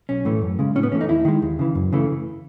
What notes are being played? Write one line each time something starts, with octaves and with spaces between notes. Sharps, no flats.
B1 C#4
A2 E3 A3
F#2
C#3 G#3
A2 C#4
B3
E3 A3 C#4
D#4
D#2 E4
D#3 G#3
D#2
C#3 E3
F#2
C#3 E3 A3